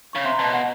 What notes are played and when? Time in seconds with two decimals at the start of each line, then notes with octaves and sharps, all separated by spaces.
0.13 C#3 C#6
0.25 C3 C6
0.33 A#5
0.39 B2 A5
0.53 F#5